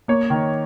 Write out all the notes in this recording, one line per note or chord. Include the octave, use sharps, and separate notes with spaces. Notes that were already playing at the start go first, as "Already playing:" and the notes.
A#3 C#5
D#3